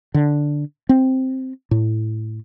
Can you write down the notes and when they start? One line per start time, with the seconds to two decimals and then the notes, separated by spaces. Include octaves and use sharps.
0.14 D3
0.89 C4
1.71 A2